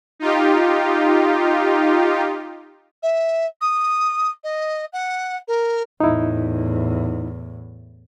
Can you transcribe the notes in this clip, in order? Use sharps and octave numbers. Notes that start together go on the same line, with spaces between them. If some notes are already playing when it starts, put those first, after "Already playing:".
D#4 F4 G4
E5
D#6
D#5
F#5
A#4
E2 A2 D#4 E4